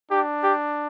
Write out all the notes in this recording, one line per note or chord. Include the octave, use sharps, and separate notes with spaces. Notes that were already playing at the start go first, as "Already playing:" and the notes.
D4 G4
G4